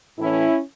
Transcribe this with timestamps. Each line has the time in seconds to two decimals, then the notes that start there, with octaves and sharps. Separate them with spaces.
0.18 A2 E3 C#4 E4